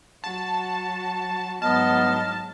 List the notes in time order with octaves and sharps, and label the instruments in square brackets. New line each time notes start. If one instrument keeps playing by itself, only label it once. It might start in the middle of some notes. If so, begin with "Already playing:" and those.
[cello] F#3 F#4 [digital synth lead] A5
[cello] G#2 F#3 [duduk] B3 [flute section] D#5 F6 [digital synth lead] A5